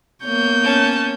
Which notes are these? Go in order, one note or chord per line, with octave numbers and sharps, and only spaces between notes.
A#3 B3 C#5 G6
C#4 A5